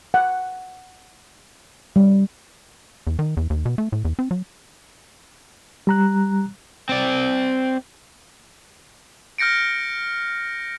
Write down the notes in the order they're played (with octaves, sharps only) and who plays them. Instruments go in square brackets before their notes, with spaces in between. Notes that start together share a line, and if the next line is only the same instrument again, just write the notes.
[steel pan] F#5
G3
[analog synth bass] E2
D#3
E2
D#2
B2
A3
A2
E2
C4
F#3
[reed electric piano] G3 A#5 F#6
[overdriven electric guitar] C4 D5
[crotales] F6 G6 A#6 C#7 D7